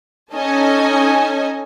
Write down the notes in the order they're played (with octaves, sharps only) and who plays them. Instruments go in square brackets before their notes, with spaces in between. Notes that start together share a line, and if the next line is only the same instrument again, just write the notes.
[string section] C#4 D#4 A4 D#5 G#5